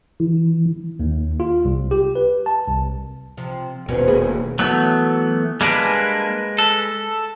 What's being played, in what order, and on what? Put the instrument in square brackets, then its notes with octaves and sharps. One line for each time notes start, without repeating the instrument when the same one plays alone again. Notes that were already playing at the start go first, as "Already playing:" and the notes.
[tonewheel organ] E3
[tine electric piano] D#2
F4
C2
G4
B4
A5
C2
[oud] C3 F3
[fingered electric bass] D#1 B2 [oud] C#4 B4 C5
[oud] A#3 G#4 B4
[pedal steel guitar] E3 A3 B3 [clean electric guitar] F#3
[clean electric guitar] G3 A#3 D4 [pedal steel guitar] G#3 B4
[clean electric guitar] A4